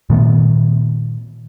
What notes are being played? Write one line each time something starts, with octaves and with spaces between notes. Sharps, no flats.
A#2 D#3 A3 B3